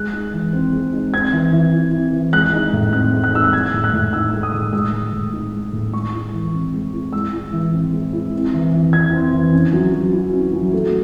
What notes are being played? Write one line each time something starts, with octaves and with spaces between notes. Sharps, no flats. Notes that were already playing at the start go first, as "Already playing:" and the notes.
Already playing: G#3 F#6
D#4
E3
C4
G#3
D#4
C4 G#6
E3
E3
E4
C4
E3
G#3 F#6
D#4
A2
C4 F#6
G#3
F#6
D#4 E6
F#6
G#3 G#6
A2
F#6
A2
D#4 E6
G#3
D#6
A2
G#3 E6
A2
A2
D#4
G#3
A2
G#3 C#6
E4
E3
C4
G#3
E4
G#3 E6
E4
E3
C4
G#3
E4
C4
E3
E3
E4 G#6
C4
E3
C#4
F#3
F#3
E4
C#4
F#3
A3